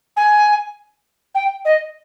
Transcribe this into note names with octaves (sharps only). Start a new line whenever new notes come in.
G#5
G5
D#5